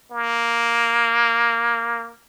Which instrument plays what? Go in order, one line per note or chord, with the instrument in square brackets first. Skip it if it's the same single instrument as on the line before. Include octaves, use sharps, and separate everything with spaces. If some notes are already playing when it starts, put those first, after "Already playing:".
[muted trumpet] A#3